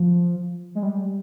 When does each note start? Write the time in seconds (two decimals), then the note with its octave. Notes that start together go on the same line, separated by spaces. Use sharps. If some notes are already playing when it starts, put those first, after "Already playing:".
Already playing: F3
0.75 G#3
0.83 G3